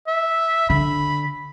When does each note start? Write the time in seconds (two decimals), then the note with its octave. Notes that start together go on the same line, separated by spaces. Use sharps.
0.08 E5
0.70 D3 B5